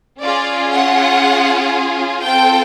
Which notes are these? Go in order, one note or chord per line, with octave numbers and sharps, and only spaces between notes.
C#4 F4 G#4 D5
F#5
C4 F4 A4 G5